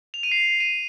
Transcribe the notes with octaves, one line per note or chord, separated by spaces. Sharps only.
F7
D#7
C7
D#7